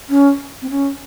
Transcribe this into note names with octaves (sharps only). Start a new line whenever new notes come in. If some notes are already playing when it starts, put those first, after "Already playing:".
C#4
C4
C#4